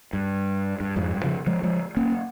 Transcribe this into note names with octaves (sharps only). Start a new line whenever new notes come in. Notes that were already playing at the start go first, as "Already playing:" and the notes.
G2
G2
F2 G#2
G2
C#3 F3
F3 G#3
F3 G#3
A#3 C#4